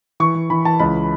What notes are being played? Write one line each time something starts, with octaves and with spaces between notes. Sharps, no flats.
E3 C#6
E3
E3 B5
E3 A5
C#2 B5